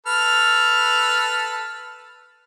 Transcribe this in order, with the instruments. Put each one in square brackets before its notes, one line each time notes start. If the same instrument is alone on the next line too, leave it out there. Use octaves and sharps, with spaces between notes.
[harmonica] A4 B4 F6